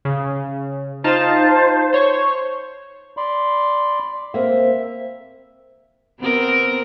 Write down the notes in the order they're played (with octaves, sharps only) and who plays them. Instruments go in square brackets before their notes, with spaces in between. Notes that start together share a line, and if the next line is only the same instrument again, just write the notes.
[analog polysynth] C#3
[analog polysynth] D#4 F4 A5 [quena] C5
[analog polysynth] C5 C#5 C#6
[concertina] D5 B5 C6
[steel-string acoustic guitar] A#3 C4 [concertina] E5
[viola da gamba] B3 C4 A#4